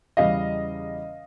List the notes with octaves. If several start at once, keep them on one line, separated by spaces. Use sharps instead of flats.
E2 C#3 E3 G3 D#5 F5